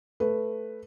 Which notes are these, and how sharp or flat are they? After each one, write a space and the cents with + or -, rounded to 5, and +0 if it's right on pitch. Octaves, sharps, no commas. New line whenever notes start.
A3 +0 B4 +0